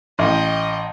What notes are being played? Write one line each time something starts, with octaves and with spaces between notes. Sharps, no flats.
A1 D#5 G5